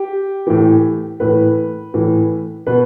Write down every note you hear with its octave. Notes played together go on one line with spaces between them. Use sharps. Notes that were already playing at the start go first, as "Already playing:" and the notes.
Already playing: G4
A2 E3
A2 E3 B4
A2 E3
B2 B4